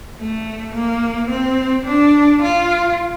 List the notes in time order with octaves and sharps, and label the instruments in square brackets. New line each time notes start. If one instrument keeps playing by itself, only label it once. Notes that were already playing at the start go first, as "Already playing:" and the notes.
[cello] A3
A#3
C4
D4
F4